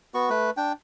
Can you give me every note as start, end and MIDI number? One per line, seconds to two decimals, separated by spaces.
0.14 0.30 59
0.14 0.30 66
0.14 0.30 85
0.30 0.50 57
0.30 0.50 71
0.57 0.72 62
0.57 0.72 79